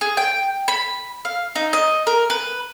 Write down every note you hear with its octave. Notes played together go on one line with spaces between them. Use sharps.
G#4
G5
B5
F5
D#4
D#5
A#4
B4